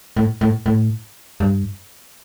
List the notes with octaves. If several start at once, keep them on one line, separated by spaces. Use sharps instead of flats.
A2
A2
A2
G2